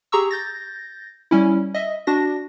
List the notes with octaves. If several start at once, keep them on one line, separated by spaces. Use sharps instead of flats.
G4 G#4 A#5 C#6 E6
G6 A6 A#6
G3 C#4 E4
D#5 E5
D4 F#4 A#6